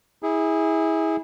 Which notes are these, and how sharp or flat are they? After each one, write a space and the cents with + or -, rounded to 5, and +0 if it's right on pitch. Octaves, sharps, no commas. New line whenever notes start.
E4 -30 G#4 -15